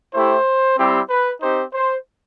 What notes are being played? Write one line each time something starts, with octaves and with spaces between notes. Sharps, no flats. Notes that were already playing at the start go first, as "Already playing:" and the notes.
A3 E4 G4 C5
G3 C4 E4 G4
B4
C4 D#4 G4 C5
C5